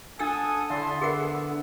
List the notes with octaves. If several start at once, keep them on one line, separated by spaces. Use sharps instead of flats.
D4 A4 F#5 G#5 D#6 E6
D3 E4 A5 C6
B3 G#4 A#4 B4 E5 F#5